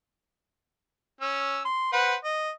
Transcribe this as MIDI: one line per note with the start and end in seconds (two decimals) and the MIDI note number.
1.21 1.61 61
1.21 1.61 88
1.65 1.91 84
1.93 2.15 71
1.93 2.15 72
1.93 2.15 78
2.24 2.50 75